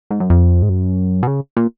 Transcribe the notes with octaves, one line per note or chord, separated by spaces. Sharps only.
G#2
F#2
F2
G#2
F#2
B2
C#3
A#2